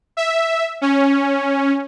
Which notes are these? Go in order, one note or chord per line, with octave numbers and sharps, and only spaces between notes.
E5
C#4